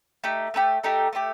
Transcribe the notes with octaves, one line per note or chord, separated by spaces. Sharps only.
A3 D#4 G4
A3 D#4 G4
A3 D#4 G4
A3 D#4 G4